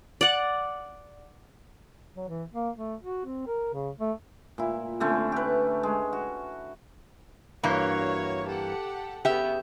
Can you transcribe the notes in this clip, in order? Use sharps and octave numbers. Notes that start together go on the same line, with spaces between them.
D5 F#5
F#3
E3
A#3
A3
F#4
C4
A#4
C#3
A3
A#2 E4
D3 A3 C4 C#4
G4 B4
G#3
F#4
G2 E3 A#3 F#4 C#5
G4 A4 F#5
C#3 B3 G4 E5